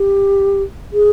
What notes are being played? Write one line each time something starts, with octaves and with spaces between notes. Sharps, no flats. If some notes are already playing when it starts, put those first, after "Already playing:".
Already playing: G4
G#4